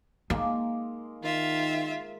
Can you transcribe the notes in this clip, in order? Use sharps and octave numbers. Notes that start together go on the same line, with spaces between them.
G#3 A#3 D#4
D#3 F4 E5